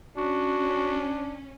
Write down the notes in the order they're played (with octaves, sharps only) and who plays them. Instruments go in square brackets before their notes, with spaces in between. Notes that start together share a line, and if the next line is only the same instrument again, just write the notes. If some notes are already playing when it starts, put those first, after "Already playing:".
[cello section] C#4 [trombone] D4 [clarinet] F#4